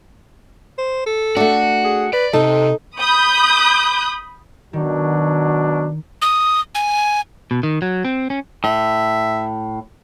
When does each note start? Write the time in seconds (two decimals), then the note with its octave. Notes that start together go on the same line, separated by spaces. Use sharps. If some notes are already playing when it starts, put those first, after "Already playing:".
0.78 C5
1.06 A4
1.37 A3 D4 F#4
1.84 G#4
2.13 B4 D5
2.33 C3 D#4 A4
2.99 B5 D#6 G6
4.73 B2 D#3 F#3 D4
6.22 D#6
6.75 G#5
7.51 B2
7.63 D#3
7.82 F#3
8.05 C4
8.30 C#4
8.64 A2 E5